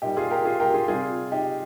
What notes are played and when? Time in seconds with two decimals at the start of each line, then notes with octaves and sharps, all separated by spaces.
0.02 A#2 G3 D#4 G4
0.17 F4 G#4
0.30 G4 A#4
0.45 F4 G#4
0.60 G4 A#4
0.74 F4 G#4
0.88 C3 G3 F4 G#4
1.32 D#4 G4